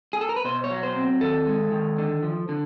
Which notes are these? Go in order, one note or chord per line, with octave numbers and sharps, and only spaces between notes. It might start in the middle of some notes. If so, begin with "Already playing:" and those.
G#4
A4
A#4
B4
B2 C5
C#5
F#3
C5
C4
D#3 A4
G#3
D#3
D3
F3
D3